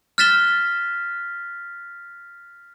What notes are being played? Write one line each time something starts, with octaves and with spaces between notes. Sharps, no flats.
F6 F#6 A6 B6 E7 G7